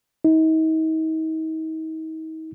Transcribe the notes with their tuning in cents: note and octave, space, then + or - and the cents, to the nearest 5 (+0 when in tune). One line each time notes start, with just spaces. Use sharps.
D#4 +40